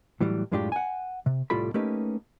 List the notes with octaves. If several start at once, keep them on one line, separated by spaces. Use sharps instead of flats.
A2 E3 F#3 G3
F#2 A2 G#3 D4 F4 G4
F#5 G#5
C3
C2 A2 G3 F4 A4 B5
A3 A#3 C#4 D#4 G4 B4